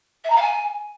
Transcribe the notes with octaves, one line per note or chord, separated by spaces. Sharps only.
E5
A#5
F5
G#5